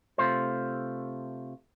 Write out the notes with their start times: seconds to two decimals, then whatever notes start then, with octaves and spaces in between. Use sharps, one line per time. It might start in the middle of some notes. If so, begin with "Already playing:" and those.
0.18 C3 A3 F4 C5